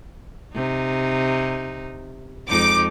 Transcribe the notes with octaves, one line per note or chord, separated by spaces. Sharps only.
C3 D#4
F2 G#3 D#4 D6